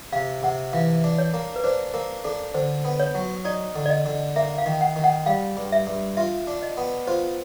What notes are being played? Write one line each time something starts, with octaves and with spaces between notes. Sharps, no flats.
C3 F5
C3 F#5
E3 F5
D4
C#5
A#3
B4
D4 C5
A#3 A#4
D4 A4
D3 C5
B3
C#5
F#3
D#4 D5
D3
D5
D#5
D3
A#3 E5
F5
D#3
F#5
D#3
F#5
G3 F5
G2
E5
G2
F4 E5
D4
D#5
B3
F4 C5